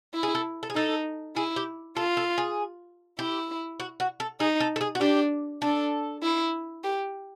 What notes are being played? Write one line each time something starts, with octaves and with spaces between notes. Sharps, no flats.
E4
G#4
A4
A4
G#4
D#4 A4
E4 G#4
G4
F4 A4
A4
G#4
E4 G4
F#4
F#4
A4
D#4 G#4
A4
A4
G#4
F#4
D4 G4
D4 A4
E4
G4